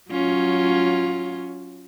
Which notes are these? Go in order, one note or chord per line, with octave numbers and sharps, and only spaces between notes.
F#3 C#4 F4